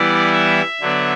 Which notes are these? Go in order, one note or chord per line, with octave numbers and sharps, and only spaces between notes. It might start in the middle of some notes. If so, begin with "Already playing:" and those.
Already playing: E3 G3 B3 E4 D5
E5
D3 F#3 B3 D4